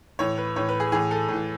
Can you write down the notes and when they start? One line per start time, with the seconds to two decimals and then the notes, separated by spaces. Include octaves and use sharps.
0.19 A2 E3 C#5
0.38 B4
0.56 A2 E3 C#5
0.69 B4
0.80 G#4
0.92 A2 E3 G#4
1.11 A4
1.29 A2 E3